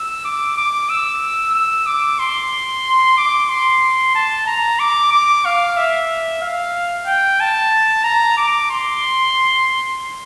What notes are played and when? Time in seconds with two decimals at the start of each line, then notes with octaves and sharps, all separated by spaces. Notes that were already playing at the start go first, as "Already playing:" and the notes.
Already playing: E6
0.25 D6
0.57 D6
0.90 E6
1.55 E6
1.86 D6
2.19 C6
3.18 D6
3.49 C6
4.15 A5
4.46 A#5
4.79 D6
5.11 D6
5.45 F5
5.77 E5
6.42 F5
7.07 G5
7.40 A5
8.04 A#5
8.37 D6
8.70 C6